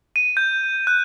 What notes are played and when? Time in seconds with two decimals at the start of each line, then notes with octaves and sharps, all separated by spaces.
0.16 D#7
0.37 G6
0.87 F#6